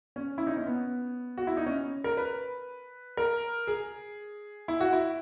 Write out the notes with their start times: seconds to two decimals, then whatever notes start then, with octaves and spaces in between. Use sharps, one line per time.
0.16 C#4
0.38 E4
0.47 D#4
0.57 C#4
0.67 B3
1.37 F#4
1.47 E4
1.57 D#4
1.66 C#4
2.04 A#4
2.17 B4
3.17 A#4
3.67 G#4
4.68 E4
4.80 F#4
4.93 E4